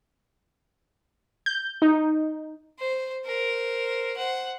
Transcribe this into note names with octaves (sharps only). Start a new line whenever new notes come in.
G6
D#4
C5
A#4 C5
C5 F#5